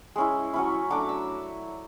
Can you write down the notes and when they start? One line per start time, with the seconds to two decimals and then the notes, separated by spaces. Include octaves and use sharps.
0.16 G#3 C#4 E4
0.54 F#3 C#4 E4
0.90 F#3 A3 D4 D6
1.09 E6